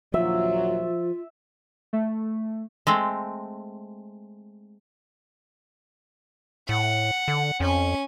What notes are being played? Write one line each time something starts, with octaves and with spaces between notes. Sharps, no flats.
A#1 D#2 F3 F#3 F4 E5
A3
G#3 A3 C4
A2 F#5
D3
F2 C#4 G#5